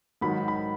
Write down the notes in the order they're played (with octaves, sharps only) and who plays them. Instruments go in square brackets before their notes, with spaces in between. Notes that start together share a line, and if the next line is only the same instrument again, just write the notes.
[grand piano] G#2 D#3 F#3 B5
B5